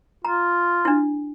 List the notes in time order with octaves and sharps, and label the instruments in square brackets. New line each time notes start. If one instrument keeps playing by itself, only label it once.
[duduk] F4 [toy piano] A#5
[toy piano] D4 E4